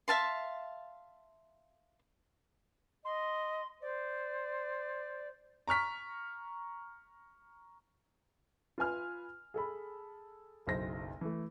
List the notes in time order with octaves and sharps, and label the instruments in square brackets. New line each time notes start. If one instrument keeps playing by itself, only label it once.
[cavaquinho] E5 F5 A5 C6
[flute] D#5 [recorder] C6
[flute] C5 [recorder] D5
[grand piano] A#5 C#6 F6 B6
F4 B4 G#5 F6
G#4 A4 B5
F#1 B1 C5 A#6
E3 A3